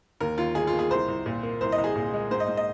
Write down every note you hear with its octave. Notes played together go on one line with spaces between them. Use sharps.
D#2 A#4
D#2 F4
D#3 G#4
F4
A#3
G#4
C2 C5
C2
A#2
A#3
C2 C5
D#5
C2
G#4
A#2
G#3
G#2 C5
D#5
G#2
D#5